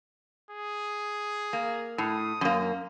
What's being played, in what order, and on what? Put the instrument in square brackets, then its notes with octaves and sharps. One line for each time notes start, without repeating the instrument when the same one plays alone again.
[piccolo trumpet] G#4
[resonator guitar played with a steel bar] A#3
[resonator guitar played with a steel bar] A2 [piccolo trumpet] D#6
[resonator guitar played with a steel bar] F#2 A#3